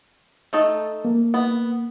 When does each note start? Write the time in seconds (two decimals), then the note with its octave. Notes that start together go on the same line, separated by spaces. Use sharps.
0.53 A3 D#4 A4
1.05 A#3
1.34 B3